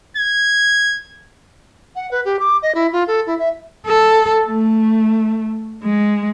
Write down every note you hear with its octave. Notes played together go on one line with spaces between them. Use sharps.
G#6
F#5
B4
G4
D6
D#5
E4
F4
A4
E4
E5
A4
A3
G#3